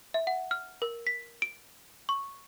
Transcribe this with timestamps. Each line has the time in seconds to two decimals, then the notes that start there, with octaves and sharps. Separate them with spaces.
0.14 E5
0.27 F#5
0.51 F6
0.82 A#4
1.07 B6
1.42 D7
2.09 C#6